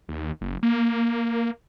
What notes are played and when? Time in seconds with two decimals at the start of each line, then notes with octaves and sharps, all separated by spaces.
0.09 D#2
0.41 F#1
0.63 A#3